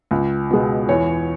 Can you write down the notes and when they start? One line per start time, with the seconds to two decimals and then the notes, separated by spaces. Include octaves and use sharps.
0.11 C#2
0.50 B2 G#3
0.89 E2 C#5